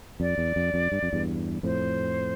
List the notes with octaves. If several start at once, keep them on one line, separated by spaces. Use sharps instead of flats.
F2 D5
E2
F2
F2
G2
F2
E2 G2
F2 A2 C5